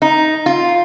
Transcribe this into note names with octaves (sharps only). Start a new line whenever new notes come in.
D#4
F4